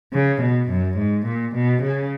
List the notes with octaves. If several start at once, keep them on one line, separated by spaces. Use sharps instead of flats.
C#3
B2
F#2
G#2
A#2
B2
C#3